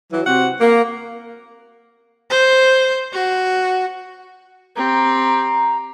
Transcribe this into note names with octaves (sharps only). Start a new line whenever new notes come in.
E3 F#3
C3 C4 F#4 F#5
A#3
C5
F#4
C4 G4 A#5